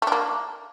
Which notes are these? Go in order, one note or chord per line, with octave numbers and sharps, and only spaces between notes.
A3 A#3 D4